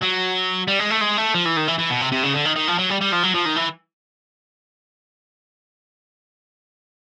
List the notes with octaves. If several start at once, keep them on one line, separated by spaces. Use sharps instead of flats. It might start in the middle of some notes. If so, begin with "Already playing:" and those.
F#3
G3
G#3
A3
G#3
A3
F3
E3
D#3
E3
E3
B2
C3
C3
C#3
D3
D#3
D#3
F3
F#3
G3
G3
F3
F#3
F3
D#3
E3